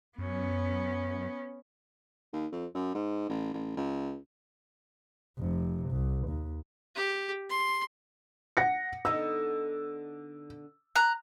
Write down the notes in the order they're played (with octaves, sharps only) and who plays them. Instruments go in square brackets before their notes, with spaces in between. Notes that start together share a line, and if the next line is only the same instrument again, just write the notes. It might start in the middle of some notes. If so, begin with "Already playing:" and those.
[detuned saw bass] F#2 [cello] B3 C#4
[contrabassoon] D#2
F2
F#2
G#2
A1
A1
C#2
[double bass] F1 C3
C2
D#2
[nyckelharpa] G4
C6
[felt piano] F#5 A#6 C#7
[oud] D3 B3 D#4 [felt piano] E6
[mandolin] A#5 F#6